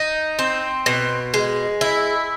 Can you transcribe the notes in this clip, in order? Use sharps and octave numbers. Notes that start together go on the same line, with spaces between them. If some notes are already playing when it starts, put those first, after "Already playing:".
Already playing: D#4
C4
B2
G#3
E4